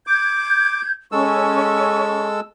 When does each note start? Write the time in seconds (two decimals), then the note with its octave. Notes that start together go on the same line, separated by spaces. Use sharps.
0.07 D6 G6 G#6
1.12 G#3 C#4 A4 C#6 E6